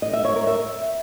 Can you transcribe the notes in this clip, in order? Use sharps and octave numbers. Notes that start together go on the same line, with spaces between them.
D#5
E5
C#5
A#4
E5